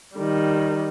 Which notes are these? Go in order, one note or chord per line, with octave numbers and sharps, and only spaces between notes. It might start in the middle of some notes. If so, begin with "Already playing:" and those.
D#3 G3